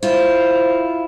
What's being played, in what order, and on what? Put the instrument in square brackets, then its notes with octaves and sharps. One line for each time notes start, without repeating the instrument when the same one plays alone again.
[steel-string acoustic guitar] E4 F4 [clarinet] C5